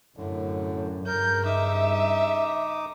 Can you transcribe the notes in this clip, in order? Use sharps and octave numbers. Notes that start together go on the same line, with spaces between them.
F#2 A2 D3
G2 C#3 A#4 G6
D#4 E5 D6 D#6